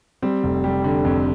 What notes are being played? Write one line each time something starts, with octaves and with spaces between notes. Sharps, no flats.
G3 C4
F1
G3
D3
F2